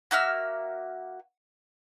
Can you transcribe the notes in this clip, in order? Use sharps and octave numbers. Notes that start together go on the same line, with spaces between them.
A#3 F#4 E5 F6